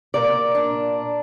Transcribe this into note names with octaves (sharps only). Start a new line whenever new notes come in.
A#2 A#4 D5
D4